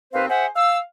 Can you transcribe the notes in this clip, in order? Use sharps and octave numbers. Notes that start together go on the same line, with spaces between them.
D#2 C4 B4 C5 F5
G#4 C5 E5 F#5
F5 E6